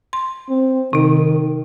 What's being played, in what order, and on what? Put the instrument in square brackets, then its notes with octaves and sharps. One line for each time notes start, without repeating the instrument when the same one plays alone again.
[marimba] C6
[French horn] C4
[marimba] C3 D#4 [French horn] D#3